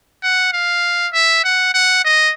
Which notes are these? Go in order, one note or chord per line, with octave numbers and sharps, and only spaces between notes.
F#5
F5
E5
F#5
F#5
D#5